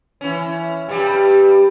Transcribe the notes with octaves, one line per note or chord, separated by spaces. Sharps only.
E3 C#4
G2 G3